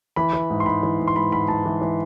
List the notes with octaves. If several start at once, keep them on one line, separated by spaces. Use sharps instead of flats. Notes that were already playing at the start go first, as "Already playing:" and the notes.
E3 B5
E3
G#2
C6
G#2 B5
E3
G#2
C6
G#2 B5
G#2 B5
G#2 A5
E3
E3